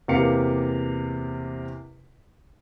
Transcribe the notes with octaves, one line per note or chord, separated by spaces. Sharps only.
E2 C3 A#3 G4 F5 C#7